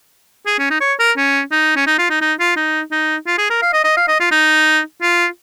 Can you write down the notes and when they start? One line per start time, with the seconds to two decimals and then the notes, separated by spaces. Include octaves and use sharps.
0.46 G#4
0.59 C#4
0.70 D#4
0.81 C#5
1.00 A#4
1.17 C#4
1.52 D#4
1.76 C#4
1.87 D#4
1.98 F4
2.10 D#4
2.21 D#4
2.40 F4
2.56 D#4
2.91 D#4
3.27 F4
3.38 G#4
3.50 A#4
3.62 F5
3.74 D#5
3.84 D#5
3.97 F5
4.08 D#5
4.20 F4
4.31 D#4
5.02 F4